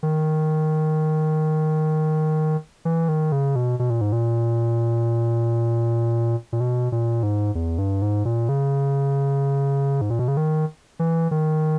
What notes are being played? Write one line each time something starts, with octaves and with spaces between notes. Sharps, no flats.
D#3
E3
D#3
C#3
B2
B2
A#2
G#2
A#2
A#2
B2
A#2
G#2
E2
G2
G#2
A#2
C#3
G#2
A#2
B2
C#3
D#3
E3
D#3